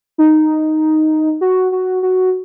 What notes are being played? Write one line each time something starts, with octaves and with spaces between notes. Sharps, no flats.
D#4
F#4
F#4
F#4